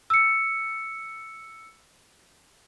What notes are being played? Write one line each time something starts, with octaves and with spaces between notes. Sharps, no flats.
E6 C#7